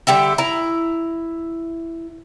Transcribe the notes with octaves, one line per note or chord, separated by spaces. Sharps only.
D3 G3 G4 E5
E4 A#5